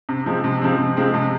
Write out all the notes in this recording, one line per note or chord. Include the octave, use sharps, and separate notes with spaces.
C3
F3 G#3 C4
C3
F3 G#3 C4
C3
F3 G#3 C4
C3